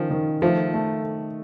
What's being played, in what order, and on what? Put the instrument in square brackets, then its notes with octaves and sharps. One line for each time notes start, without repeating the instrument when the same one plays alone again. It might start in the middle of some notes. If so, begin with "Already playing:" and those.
Already playing: [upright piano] D#3 C#4 [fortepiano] F3
[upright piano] D#3
[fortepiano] F3 [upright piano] A3
[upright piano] A3